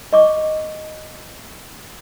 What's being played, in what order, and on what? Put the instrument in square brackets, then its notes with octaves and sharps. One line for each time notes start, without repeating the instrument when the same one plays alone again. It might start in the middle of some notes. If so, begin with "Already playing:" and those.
[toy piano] D#5 C#6 D6